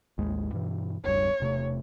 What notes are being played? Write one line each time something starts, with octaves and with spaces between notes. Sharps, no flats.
A1 D#2 G#3
G2 B2 E3
E1 C#2 G2 C#5
E1 C3 A3